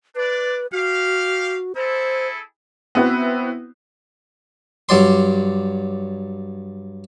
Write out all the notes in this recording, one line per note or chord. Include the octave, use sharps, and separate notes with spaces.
D4 B4 D5
F#4 G4 F5
E4 G#4 A4 C5
B3 C4 E4 F#4 B4
G2 F#3 D5 C6